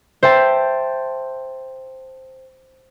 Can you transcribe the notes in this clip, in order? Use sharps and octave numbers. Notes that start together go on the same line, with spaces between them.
C5 E5 G5 A5